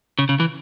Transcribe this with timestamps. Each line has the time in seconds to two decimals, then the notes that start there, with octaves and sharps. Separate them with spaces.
0.19 C#3
0.29 C#3
0.40 E3